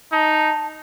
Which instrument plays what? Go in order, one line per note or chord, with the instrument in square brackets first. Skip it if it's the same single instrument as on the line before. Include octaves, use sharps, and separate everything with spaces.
[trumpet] D#4 [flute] A5